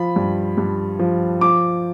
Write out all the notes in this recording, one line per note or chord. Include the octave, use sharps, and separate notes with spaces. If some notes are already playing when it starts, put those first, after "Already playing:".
Already playing: F3 B5
G2
G2
F3
F3 D6